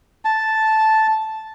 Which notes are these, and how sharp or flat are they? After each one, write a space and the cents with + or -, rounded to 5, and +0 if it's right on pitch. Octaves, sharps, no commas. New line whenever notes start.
A5 -5